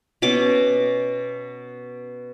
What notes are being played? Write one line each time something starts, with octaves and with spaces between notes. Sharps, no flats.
B2 C#4 D6